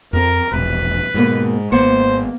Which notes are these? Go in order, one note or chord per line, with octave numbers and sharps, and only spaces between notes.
F2 C4 A#4
E1 A#1 B4
D#2 G#2 B2 A#3
G#1 A#3 B3 C5 F#5